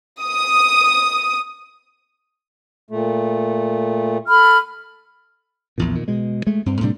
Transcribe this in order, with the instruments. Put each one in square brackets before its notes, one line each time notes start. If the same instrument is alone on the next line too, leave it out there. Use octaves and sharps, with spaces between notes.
[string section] D#6
[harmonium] A#2 A3
[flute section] A4 B5 F6
[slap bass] A#1 E2 A#2
A#2 D#3
B2 G#3
G#3 A3
G2 C4
A2 C3 G3 D4